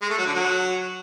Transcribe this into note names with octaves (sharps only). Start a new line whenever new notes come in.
G#3
A3
F#3
D3
F#3